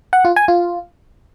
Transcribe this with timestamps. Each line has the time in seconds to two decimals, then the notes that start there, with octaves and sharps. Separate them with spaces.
0.13 F#5
0.25 F4
0.36 G#5
0.48 F4